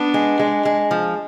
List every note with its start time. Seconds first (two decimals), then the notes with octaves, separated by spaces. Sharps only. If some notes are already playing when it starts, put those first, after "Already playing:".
Already playing: B3 D4
0.14 G#3
0.39 G#3
0.65 G#3
0.91 F3